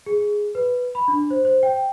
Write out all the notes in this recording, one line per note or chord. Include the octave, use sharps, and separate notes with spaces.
G#4
B4
B5
D4
C5
C5
G5